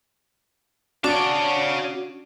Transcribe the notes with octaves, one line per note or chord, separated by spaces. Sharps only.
C#4 D4 F#4 C#5 D5 F5 A5 D7